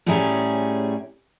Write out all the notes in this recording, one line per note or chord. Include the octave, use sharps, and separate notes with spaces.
A2 G3 C#4 G#4 E5 A#5